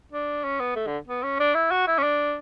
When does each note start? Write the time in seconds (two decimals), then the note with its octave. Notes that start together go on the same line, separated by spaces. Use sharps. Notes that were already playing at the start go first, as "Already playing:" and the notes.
0.12 D4
0.44 C#4
0.60 B3
0.75 A3
0.86 D3
1.07 B3
1.23 C#4
1.39 D4
1.55 E4
1.71 F#4
1.87 E4
1.98 C#4
2.03 D4